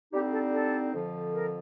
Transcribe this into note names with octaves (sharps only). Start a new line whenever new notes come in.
D3 G3 C4 D#4 G4
A4
A4
F2 D3 F3
A#4